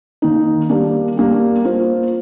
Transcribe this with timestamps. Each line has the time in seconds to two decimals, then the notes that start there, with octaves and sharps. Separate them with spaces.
0.22 D#3 A#3 D#4
0.69 G3 A#3 D4
1.17 G3 A#3 D4
1.65 A#3 F4 C5